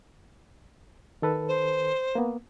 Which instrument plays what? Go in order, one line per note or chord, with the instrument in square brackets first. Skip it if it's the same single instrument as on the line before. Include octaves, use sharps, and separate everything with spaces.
[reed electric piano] D#3 A4 B4
[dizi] C5
[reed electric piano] A#3 B3